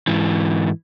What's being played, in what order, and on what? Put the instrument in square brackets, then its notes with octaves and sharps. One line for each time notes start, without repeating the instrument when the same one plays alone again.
[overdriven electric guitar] G#2 E3